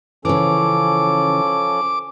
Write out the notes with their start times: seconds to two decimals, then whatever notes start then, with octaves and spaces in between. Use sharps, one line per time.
0.25 C#3 E3 F3 C#4 A4 D6